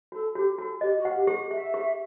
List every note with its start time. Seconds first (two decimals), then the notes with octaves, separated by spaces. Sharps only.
0.12 F#4 A4
0.35 F#4 G4
0.58 F#4 A4
0.81 G4 D#5
0.99 F#4
1.05 F#5
1.16 G4
1.27 G4
1.51 G4 E5
1.74 G4